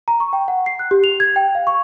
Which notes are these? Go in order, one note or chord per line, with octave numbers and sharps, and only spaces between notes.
A#5
C#6
G5
F#5
C7
F#6
G4
F7
G#6
G5
F5
C#6